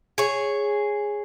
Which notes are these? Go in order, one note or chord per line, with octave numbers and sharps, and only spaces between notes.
G#4 C#5